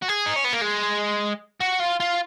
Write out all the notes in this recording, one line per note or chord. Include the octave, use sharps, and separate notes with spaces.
F#4
G#4
D#4
C#4
B3
A#3
G#3
F#4
F4
F4